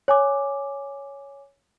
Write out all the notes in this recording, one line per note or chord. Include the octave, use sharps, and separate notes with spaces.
C#5 G#5 D6